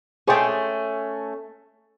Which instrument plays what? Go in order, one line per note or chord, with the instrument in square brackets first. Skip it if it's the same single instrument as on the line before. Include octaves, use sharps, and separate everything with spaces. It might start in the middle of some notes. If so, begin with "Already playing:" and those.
[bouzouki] A3 C#4 [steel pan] G#4 C5 G5